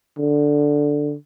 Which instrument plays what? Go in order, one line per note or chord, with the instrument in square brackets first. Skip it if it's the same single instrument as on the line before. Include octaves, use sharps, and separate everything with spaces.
[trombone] D3